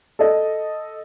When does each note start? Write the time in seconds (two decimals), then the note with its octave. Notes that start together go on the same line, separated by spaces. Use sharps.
0.19 A4 D#5